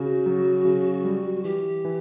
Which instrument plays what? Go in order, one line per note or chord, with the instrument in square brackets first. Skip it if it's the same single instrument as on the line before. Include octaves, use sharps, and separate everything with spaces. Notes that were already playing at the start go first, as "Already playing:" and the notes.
Already playing: [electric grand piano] C#3 [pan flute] F#4
[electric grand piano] F#3
C#3
G3
[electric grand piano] E3 [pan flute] G4
[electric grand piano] E3